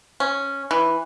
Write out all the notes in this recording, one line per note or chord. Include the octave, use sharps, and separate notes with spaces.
C#4
E3